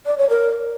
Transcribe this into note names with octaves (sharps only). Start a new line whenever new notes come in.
D5
C#5
A#4